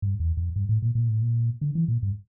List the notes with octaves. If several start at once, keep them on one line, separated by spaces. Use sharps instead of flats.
G2
E2
F2
G2
A2
A#2
A#2
A2
A#2
D3
E3
A#2
G2